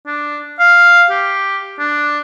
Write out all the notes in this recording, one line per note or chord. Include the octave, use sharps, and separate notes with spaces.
D4
F5
G4
D4